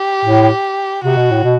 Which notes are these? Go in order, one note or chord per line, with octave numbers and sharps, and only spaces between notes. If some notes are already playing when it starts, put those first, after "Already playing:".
Already playing: G4
A2
C3 F#4
B2
A2
B2